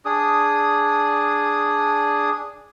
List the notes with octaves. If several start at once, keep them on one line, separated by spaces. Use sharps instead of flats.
D4 G#4 D#6